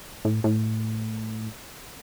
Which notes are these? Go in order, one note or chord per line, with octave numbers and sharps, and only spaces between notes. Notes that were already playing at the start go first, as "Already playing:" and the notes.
A2
A2